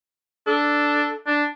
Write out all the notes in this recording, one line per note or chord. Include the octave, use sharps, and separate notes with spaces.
D4 A4
D4